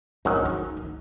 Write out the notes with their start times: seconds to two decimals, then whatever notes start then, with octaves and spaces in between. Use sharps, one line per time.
0.25 G#1 F#2 D#3 F#3 D#4
0.35 D4
0.45 D#4
0.77 D#4